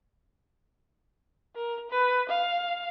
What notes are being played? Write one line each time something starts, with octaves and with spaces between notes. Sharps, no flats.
A#4
B4
F5